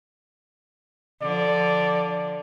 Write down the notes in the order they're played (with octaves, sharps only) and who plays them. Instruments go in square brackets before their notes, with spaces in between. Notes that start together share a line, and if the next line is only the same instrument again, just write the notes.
[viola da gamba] D3 F3 [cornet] D5